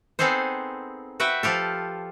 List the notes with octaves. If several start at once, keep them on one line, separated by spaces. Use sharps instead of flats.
B3 C4 D#4 G#4 A4 C5
F#4 B4 E5 F#5 G5
F3 F4 G4 A4